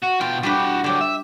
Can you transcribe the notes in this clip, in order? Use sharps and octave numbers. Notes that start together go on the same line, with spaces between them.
F#4
B2 F4 G5
G3 D4 F#4 B4 G5
D3 F#3 G4 G5
E5